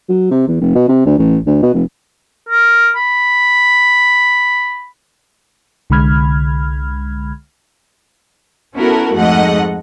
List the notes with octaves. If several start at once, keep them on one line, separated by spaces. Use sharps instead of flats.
F#3
C3
E2
F1
B2
C3
D2
A1
D2
B2
F1
A#4
B5
C2 D3 G#3 B5 F6 G#6
B3 C#4 E4 F#4 A4 A#4
F2 G#2 A3 D#5 F#5